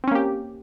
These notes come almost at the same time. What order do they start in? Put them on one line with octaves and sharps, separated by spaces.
C4 C#4 A#3 G4